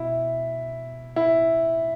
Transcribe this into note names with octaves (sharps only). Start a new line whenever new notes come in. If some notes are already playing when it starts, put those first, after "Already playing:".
Already playing: B2 E4
E4